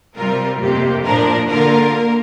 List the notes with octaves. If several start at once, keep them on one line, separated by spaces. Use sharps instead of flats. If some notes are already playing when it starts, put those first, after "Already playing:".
C3 G3 C4 F4 A#4
F2 C3 A#3 G4
A#2 F3 D4 A#4
D3 A#3 F4 A#4
A#3